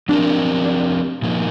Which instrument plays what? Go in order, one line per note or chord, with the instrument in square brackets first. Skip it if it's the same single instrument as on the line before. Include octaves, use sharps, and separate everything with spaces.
[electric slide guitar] F3 C4 G4 A#4 [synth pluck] D4
[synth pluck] D4
[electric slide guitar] A#2 F3 A#3 D#4